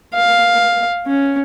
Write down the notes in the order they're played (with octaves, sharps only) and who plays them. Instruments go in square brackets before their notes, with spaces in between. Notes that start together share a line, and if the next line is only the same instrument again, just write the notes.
[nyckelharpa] F5
C#4